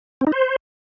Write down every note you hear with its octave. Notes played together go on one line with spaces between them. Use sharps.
C4
D#4
C5